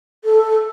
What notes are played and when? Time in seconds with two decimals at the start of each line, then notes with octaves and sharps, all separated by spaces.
0.24 A4